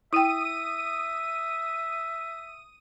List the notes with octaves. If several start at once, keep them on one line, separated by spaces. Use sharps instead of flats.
E4 E5 G5 D#6 D#7